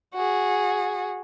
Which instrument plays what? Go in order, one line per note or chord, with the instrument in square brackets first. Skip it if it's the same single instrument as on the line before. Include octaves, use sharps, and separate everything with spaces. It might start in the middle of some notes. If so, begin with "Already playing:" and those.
[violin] F#4 G#4